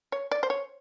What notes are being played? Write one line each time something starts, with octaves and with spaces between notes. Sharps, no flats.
C#5
D5
C5
C#5